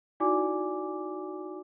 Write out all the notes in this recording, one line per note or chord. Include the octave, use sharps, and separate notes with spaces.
D#4 E4 F#4 D5 G#5 D6